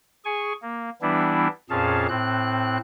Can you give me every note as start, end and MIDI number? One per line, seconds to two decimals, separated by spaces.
0.25 0.53 68
0.25 0.53 80
0.25 0.53 85
0.62 0.90 58
1.02 1.47 52
1.02 1.47 55
1.02 1.47 59
1.02 1.47 62
1.02 1.47 64
1.70 2.06 41
1.70 2.06 46
1.70 2.06 61
1.70 2.06 68
1.70 2.06 77
1.70 2.06 81
2.09 2.77 45
2.09 2.77 60
2.09 2.77 90